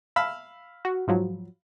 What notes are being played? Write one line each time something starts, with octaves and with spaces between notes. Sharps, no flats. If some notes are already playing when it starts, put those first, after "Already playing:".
F5 B5 E6
F#4
G#2 F3 F#3